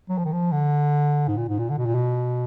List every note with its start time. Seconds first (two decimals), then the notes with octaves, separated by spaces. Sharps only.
0.09 F#3
0.18 F3
0.25 D#3
0.33 F3
0.52 D3
1.28 G#2
1.37 A#2
1.49 G#2
1.59 A#2
1.70 D3
1.78 B2
1.86 A#2
1.95 B2